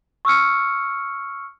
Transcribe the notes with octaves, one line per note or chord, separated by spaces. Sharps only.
C#6 E6 F6 C#7